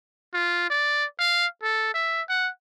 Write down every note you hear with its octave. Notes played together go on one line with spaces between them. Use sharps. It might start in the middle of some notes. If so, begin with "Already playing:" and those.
F4
D5
F5
A4
E5
F#5